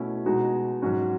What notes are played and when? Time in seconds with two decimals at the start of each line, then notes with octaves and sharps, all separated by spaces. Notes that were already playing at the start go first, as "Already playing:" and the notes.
Already playing: B2 A3 C#4 E4
0.26 B2 G#3 D#4 F#4
0.82 G#2 F#3 C#4 F#4